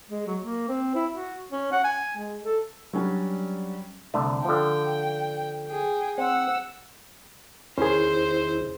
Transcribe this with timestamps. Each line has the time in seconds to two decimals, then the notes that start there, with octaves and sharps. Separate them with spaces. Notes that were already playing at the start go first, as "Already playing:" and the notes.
0.10 G#3
0.27 F#3
0.41 A#3
0.68 C4
0.95 E4
1.13 F#4
1.52 C#4
1.72 F#5
1.84 G#5
2.17 G#3
2.44 A4
2.93 F#3 G3 C#4 D4
4.14 C2 D3 A3
4.45 D3 F3 G5
5.67 G#4 G5
6.18 C4 F#5 E6
7.78 E2 D#3 C#4 E4 G#4 C5